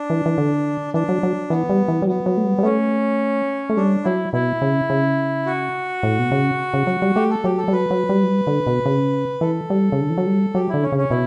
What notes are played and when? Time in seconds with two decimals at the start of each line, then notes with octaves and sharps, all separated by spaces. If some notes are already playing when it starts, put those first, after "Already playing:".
Already playing: D4
0.10 E3
0.26 E3
0.38 D3
0.94 E3 D4
1.09 F#3
1.23 F#3
1.50 E3 B3
1.69 G3
1.88 E3
2.02 G3
2.07 F#3 B3
2.26 F#3
2.37 A3
2.44 G3
2.58 G3
2.63 A3 C#4
3.70 A3
3.77 G3 D4
4.04 F#3 E4
4.33 B2 E4
4.62 C#3
4.90 C#3
5.46 F#4
6.03 A2
6.19 B2
6.32 C#3
6.74 C#3
6.87 F#3
7.02 G3
7.16 A3 G4
7.30 A4
7.44 F#3 G4
7.58 A4
7.68 G3
7.72 F#3 B4
7.91 F#3
8.09 G3
8.23 F#3
8.28 G3
8.47 D3
8.67 B2
8.86 C#3
9.41 E3 A4
9.70 G3
9.92 C#3
10.01 D3
10.10 E3
10.18 F#3
10.27 G3
10.55 F#3 G4
10.69 D3 E4
10.82 C#4
10.92 C#3
10.97 C#4
11.11 B2 E4